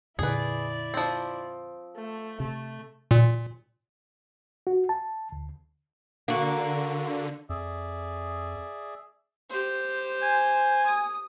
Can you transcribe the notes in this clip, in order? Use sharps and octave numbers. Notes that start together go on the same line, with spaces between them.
F2 A#2 D3 E4 G#4 B4 D5
F3 C4
A3
C3 A3
A#2
F#4
A5
D2
D3 A#3 F#4
F2 G#4 D5 E5
G4 C5
G#5
D#6